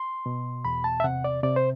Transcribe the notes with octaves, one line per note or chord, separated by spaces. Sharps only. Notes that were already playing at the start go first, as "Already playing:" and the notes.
Already playing: C6
B2
E2 B5
A5
E5
C3 F#5
D5
C3 D5
C5